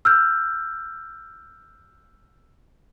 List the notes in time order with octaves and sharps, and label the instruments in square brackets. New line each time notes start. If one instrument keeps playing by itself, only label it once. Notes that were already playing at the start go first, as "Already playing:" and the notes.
[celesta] E6 F6 G6